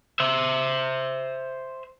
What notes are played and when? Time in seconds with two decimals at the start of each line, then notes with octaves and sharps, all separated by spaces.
0.20 C5 E5